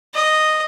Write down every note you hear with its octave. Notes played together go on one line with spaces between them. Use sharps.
D#5